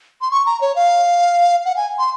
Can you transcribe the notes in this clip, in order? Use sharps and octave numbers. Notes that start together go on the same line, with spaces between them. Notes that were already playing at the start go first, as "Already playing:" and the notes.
C6
C#6
A#5
C#5
F5
F#5
G#5
C6